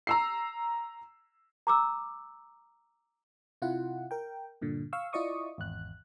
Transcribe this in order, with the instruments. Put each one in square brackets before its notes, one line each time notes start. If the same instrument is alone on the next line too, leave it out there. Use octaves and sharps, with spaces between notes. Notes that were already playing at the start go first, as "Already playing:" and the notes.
[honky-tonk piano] A#5 E6 C7
[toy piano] A#5 D6 E6
[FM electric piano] C3 E4 F4 F#5
A#4 G5
G2 A#2 D3
F5 C#6 E6
E4 F4 D5 D#5 C#6 D#6
G#1 E2 F#6